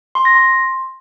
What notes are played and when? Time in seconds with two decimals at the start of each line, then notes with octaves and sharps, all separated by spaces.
0.15 C6
0.25 A#6
0.35 C6